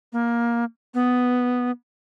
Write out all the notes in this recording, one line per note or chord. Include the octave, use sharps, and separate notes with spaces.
A#3
B3